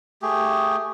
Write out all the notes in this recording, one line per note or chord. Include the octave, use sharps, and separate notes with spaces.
A3 G4 G#4